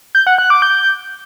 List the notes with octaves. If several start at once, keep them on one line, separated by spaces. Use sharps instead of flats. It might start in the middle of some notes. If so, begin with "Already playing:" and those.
G6
F#5
F#6
D6
G6